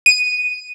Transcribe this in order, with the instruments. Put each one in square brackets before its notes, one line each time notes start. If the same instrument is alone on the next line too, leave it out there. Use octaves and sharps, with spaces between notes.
[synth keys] D#7